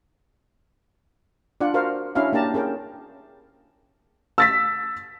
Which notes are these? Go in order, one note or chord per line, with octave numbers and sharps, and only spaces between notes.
D4 F4 D5 F#5
F#4 A#4 C5 F5
C#4 D4 E4 F#4 E5 F5
A#3 D4 G4 A5 A#5
C#4 G#4 A#4 G5
E6 A6 B6